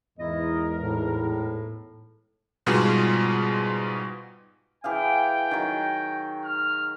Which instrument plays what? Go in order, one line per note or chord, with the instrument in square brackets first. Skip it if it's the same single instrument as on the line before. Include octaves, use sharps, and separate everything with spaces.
[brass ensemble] E2 G#2 A#4 [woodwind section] E4 D#5
[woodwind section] A2
[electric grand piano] G#2 B2 G3 F4 F#4 G#4
[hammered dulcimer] E3 G#4 F5 [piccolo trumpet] G5
[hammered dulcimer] D#3 F#3
[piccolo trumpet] F6